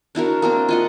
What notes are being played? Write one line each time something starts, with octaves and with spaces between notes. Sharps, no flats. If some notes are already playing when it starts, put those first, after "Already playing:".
D4 E4 F#4 A#4
A#3 C4 D4
F4 D#5 F#5